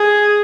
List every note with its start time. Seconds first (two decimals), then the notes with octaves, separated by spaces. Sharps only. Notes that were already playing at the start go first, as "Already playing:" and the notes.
Already playing: G#4